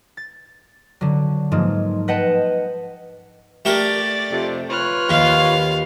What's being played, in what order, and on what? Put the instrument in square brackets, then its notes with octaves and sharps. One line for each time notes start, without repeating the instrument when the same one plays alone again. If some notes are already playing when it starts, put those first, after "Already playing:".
[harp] A6
D3 F#3
G#2 F3 G#3 A#3
B4 D#5 F#5 G5 A5
[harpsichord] A3 G4 A#4 [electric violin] D5 A6
[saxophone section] F2 C3
[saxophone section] F4 B4 C#5 [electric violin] F6 F#6
[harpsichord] D#2 [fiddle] F5